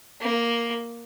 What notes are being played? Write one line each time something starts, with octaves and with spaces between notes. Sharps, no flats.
A#3